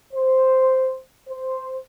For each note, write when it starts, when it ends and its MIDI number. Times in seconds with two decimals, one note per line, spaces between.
0.13 0.96 72
1.28 1.75 72